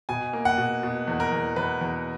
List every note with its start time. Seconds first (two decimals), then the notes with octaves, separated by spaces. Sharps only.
0.09 B2 G#5
0.33 A#3
0.45 F#5
0.58 B2
0.83 B2
1.08 E2
1.20 A#4
1.32 E2
1.56 E2 B4
1.81 E2